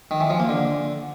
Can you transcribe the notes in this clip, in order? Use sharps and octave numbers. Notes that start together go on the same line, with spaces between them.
D#3
E3
F3
A#3
D3